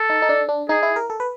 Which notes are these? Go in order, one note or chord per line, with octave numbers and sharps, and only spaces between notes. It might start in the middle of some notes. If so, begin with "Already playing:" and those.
Already playing: A4
D#4
D#4
D4
D4
D#4 G#4
E4
A#4
A4
B4